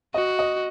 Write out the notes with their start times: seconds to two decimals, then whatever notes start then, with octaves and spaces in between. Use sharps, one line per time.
0.14 F#4 D#5
0.39 D#5